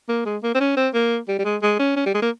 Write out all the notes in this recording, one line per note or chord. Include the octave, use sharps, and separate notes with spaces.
A#3
G#3
A#3
C4
C#4
C4
A#3
G3
G3
G#3
G#3
C#4
C#4
G3
G#3
A#3